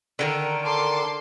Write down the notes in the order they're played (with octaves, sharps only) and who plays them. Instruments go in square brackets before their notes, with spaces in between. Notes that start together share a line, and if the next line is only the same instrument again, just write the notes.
[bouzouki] D3 D#3 A#4
[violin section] A4 C6 D6